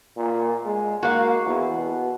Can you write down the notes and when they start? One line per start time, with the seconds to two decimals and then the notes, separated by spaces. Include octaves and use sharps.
0.17 A#2
0.65 G#3
1.03 A#3 F#4 F5
1.46 E2
1.77 B2